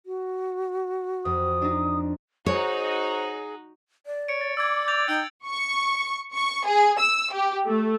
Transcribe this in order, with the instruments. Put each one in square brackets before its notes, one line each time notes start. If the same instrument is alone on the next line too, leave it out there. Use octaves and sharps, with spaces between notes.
[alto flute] F#4
[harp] F2 [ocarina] D#6
[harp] D4 D#4
[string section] D#4 F#4 [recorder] G#4 [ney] C5 [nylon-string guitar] C#5
[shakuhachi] D5
[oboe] C#5 [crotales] C#7 D7
[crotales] A6
[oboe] D5 [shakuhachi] D6 [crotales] E6 G#6
[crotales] G6 A6 F7
[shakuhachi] D#4 [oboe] G5 [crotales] E6 G#6 D7
[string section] C#6
C#6
G#4
E6
G4
A3